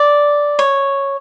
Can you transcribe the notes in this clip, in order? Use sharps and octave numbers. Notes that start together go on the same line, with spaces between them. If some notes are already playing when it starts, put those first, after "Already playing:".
Already playing: D5
C#5